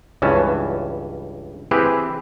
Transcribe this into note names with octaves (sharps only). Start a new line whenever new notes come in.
C#2 G2 E3 C#4 A5
E3 C4 E4 G4 G#4 B4